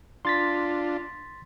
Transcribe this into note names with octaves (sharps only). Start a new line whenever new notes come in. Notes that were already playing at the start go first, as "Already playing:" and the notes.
D4 F4 C6 A6 B6